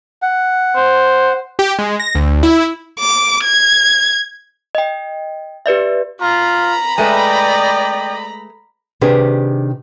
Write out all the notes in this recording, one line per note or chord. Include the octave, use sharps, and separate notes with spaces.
F#5
C5
G4
G#3
A#6
D2
E4
D6
G#6
D#5 G5
G4 B4 D5 E5
F4 A#5 B5
G#3 A3 B4 D5 D#5 G5
C3 D#3 D4 G4 G#4 B4